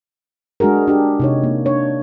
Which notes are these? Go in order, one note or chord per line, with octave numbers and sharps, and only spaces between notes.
G#3 D4 F#4 G#4 A#4
D4 G4
C3 D#4 C#5
A#3
D4 C#5